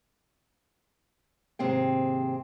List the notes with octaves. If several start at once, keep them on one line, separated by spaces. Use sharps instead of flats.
D#2 G#2 C3 C4 G#4 G5